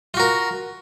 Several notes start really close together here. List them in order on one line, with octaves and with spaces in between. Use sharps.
F4 F#4 A#4